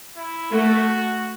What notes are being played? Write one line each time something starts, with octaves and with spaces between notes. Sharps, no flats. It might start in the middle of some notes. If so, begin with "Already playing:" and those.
E4
A3 F#4